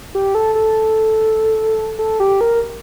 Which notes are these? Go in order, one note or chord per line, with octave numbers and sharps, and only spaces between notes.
G4
A4
A4
A4
G4
A#4